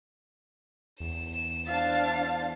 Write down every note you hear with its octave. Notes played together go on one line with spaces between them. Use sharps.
E2 E7
D4 C5 F5 A6